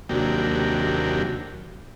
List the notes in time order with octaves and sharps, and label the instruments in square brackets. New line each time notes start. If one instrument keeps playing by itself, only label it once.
[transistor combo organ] D#2 C3 F#3 A#3 D4 G5